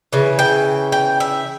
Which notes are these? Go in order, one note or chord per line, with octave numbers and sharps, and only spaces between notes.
C#3 E3
G5
G5
E5